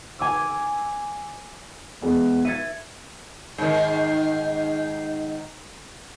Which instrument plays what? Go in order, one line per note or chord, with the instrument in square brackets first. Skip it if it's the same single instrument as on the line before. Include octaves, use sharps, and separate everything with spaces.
[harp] G#5 D6 E6
[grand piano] E2 G#3 B3
[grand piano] E5 A6 [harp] G#6 C#7 D#7
[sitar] G#2 D#3